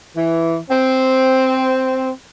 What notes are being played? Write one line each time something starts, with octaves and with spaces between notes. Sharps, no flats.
E3
C4